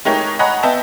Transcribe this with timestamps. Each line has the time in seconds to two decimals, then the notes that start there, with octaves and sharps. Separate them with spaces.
0.05 G#3 A3 D#4 G4 A#4 C#5
0.39 C#5 D#5 F#5 G#5 A#5 B5
0.63 B3 D#5 E5 G5 A5